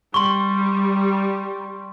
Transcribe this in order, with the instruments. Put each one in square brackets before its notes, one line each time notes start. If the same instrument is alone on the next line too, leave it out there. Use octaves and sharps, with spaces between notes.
[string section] G3 [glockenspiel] C6 C#6